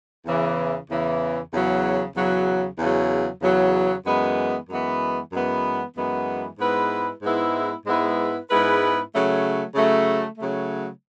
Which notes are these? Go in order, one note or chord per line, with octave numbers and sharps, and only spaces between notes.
E2 C#3 E3
E2 C#3 E3
E2 C#3 F#3
E2 C#3 F#3
E2 C#3 F#3
E2 C#3 F#3
F#2 E3 G#3 B3
F#2 E3 G#3 B3
F#2 E3 G#3 B3
F#2 E3 G#3 B3
G#2 G#3 B3 E4 B4
G#2 G#3 B3 E4 B4
G#2 G#3 B3 E4 B4
G#2 G#3 B3 E4 B4
C#3 F#3 A3
C#3 F#3 A3
C#3 F#3 A3